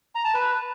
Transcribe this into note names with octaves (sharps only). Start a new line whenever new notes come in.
A#5
A5
B4